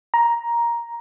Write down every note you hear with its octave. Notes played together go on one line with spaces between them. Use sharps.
A#5